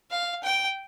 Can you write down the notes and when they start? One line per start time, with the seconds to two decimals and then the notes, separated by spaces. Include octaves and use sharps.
0.11 F5
0.43 G5